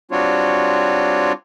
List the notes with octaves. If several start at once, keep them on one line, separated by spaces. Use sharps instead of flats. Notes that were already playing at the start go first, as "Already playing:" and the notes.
G3 C4 D4 F4 F#4 C#5